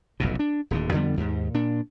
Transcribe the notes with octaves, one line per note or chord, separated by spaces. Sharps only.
F1 B1 F#2 B2
D4
D1 D#2 D3
F2 D3 G3 B3
D#2 G#2
A#2 D4